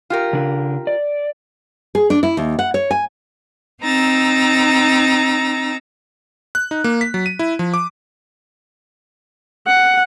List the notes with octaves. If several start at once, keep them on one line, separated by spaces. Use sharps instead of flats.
F4 G4 A#4
C#3 D4
D5
G#4
D4
E4
D#2
F#5
C#5
G#5
C4 D#4 A#5 E6 A6
F#6
D#4
A#3
B6
F#3
D#7
E4
F3
D6
F#5